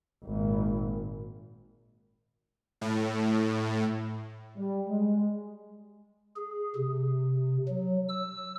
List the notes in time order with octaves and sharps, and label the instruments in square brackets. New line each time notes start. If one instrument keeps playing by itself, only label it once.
[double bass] G#1 A#2
[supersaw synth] A2
[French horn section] G3
G#3
[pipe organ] G#4
C3
F#3
E6